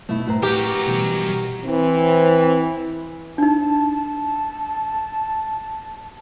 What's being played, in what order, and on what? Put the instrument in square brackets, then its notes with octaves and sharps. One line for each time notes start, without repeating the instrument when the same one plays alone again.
[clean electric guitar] B2 [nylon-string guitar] A3 D#4 E4
[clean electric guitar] A2 A#5 [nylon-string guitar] B4 C5
[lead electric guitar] F#4 A#4 [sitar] G4 [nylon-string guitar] B4
[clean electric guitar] B2 E3 G3
[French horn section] E3 C4
[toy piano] D4 D#4 [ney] A5